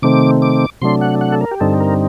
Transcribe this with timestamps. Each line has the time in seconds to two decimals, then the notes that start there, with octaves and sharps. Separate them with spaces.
0.02 C3 D#3 A3 C4 D6
0.42 D6
0.82 C3 F#3 A3 D4 C6
1.01 F#5
1.21 F#5
1.32 A4
1.41 A#4
1.51 G4
1.60 G2 D3 G3 C4 D#4 A4
1.80 A#4